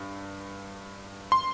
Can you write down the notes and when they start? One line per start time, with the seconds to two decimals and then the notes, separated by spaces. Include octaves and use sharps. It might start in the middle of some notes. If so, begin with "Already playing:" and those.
Already playing: G2
1.32 C6